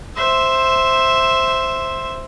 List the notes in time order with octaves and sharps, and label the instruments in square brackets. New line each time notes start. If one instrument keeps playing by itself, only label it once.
[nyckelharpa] C5 E5